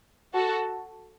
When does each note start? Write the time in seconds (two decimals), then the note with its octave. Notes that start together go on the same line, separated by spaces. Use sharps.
0.34 F#4 A4